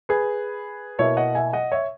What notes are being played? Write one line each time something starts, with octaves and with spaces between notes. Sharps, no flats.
G#4 B4
B2 A#3 E4 C#5 E5
D#5 F#5
E5 G#5
D#5 F#5
C#5 E5